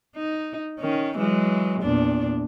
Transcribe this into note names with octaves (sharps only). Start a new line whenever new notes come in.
D#4
D#3 C#4
E3 F#3 G#3
E2 A#2 D4